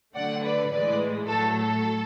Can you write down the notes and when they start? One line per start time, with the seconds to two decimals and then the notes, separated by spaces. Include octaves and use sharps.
0.14 D3 F#3 A3 D5 F#5
0.43 B4 D5
0.71 A2 E3 G#3 B4 D5
1.27 A2 F#3 A3 A4
1.55 A4